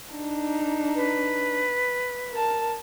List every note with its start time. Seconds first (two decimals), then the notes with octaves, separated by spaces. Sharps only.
0.14 D4 D#4
0.95 B4
2.31 A#4 A5